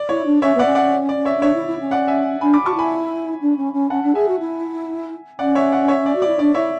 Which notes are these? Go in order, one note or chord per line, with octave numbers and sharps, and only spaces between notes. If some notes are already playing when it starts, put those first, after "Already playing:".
Already playing: D5
E4 C#5
D4
C#4 C#5 E5
B3 D5 F#5
C#4
D5 F#5
D5
C#5 E5
C#4
D4 C#5 E5
E4
E4
C#4
D5 F#5
E5 G#5
D4 G#5 B5
B5 D6
F#4 A5 C#6
E4 G#5 B5
D4
C#4
C#4
C#4 F#5 A5
D4
G#4 E5 G#5
F#4
E4
C#4 D5 F#5
C#5 E5
D5 F#5
C#5 E5
D5
F#4
E4 D5
D4 D5
E4 C#5 E5